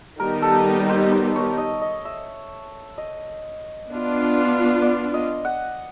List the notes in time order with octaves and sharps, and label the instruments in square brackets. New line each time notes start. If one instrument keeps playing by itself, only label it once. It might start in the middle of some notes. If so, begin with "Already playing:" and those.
[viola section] D#3 G3 B3 D#4 G4 [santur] A#4
[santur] A4
C5
C5
C#5
D#5
D#5
E5
D#5
[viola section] B3 D4 F4
[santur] D5
D#5
F#5